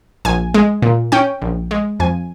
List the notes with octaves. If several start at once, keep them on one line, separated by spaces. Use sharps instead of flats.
A#1 G#5
G#3
A#2
C#4 G5
A#1
G#3
F2 G#5